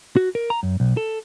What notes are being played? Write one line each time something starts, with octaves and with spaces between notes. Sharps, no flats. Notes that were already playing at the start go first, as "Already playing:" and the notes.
F#4
A#4
A#5
F#2
B1
A4